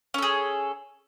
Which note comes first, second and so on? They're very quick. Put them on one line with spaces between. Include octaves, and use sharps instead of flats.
C#4 A4 G#4